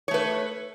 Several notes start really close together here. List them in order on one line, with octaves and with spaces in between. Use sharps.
C#5 A3 B4